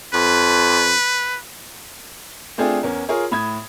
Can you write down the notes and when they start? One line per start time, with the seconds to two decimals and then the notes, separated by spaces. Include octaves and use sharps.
0.13 F2 B4
2.58 A3 C4 D4 F4 G#4
2.83 E2 C#4 A#4
3.09 F4 G#4 A#4 C#5
3.31 A2 B5 D#6 G#6